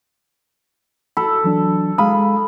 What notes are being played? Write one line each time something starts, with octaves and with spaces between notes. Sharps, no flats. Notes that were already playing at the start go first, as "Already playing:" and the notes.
A4 B5
E3 F#3 D4
G#3 F5 B5 D#6